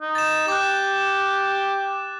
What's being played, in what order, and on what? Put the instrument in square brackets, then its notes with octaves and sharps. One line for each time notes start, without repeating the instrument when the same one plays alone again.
[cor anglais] D#4
[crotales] A6 E7
[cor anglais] G4 [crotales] D6 F#6